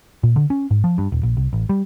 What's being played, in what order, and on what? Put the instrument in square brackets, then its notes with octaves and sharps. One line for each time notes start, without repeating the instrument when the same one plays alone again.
[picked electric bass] A#2
D3
C#4
G#2
F3
G2
D#1
A#1
C2
A1
G3